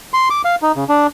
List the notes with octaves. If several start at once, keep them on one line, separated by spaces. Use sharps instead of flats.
C6
D6
F5
D#4
C#3
D4